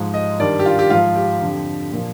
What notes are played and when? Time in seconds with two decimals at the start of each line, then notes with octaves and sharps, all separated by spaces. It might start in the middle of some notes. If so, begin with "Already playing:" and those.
Already playing: G#2 F3
0.14 D#5
0.39 G2 D#3 D5
0.59 G4
0.66 F4
0.79 G4
0.90 G#2 F3 F4
1.16 G4
1.41 F2 D3 F3
1.92 A#2 F3